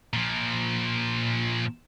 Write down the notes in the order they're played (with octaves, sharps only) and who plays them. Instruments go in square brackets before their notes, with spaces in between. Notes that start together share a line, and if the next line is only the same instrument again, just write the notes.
[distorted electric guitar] A#2 F3